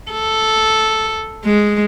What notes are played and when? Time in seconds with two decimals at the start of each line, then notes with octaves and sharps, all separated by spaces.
0.12 A4
1.45 G#3